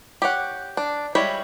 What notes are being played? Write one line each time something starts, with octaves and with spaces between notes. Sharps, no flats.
G4 C#5 F#5
D4
G3 G#3 E4 C#5 B5